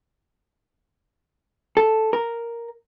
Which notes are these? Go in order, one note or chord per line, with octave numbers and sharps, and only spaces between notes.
A4
A#4